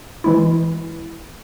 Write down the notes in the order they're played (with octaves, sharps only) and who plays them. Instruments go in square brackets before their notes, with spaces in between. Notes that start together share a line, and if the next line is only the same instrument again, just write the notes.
[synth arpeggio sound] E3 G#3 E4